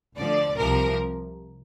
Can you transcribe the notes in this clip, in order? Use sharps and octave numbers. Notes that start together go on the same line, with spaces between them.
D2 D3 F3 D5
C2 C3 F3 A#4